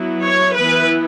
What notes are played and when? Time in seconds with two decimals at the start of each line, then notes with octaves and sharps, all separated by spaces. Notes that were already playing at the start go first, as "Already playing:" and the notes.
Already playing: F#3 B3 E4
0.23 C#5
0.54 E3 B3 E4 B4